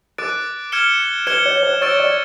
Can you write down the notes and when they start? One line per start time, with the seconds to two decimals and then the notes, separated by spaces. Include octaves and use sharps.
0.18 A#4 D6 F#6 A6 D7
0.72 F6 G#6 C#7 E7 G7
1.27 B4 F6 G#6 C#7 E7 G7
1.46 C#5
1.63 C5
1.81 C#5 C#6 E6 A6 D7 G7
2.00 D5